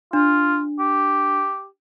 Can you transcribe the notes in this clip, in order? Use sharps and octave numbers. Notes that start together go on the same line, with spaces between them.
D4 F4
G4